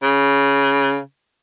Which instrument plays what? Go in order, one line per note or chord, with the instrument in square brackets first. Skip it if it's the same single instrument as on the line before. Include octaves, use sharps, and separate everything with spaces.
[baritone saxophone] C#3